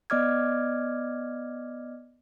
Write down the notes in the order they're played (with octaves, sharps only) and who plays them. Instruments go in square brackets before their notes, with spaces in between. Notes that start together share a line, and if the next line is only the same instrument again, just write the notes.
[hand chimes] B3 D5 D#5 D6 F6 G#6